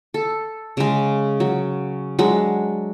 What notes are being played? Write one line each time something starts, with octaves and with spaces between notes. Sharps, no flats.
A4
C#3 G#3
F#3
F#3 G#3 D4